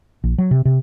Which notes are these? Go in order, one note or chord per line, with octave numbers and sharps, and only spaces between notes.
A#1
F#3
C3
C3